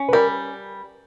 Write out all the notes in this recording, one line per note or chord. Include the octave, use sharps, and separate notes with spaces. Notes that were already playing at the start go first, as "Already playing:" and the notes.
Already playing: C#4
B4
G3 A#4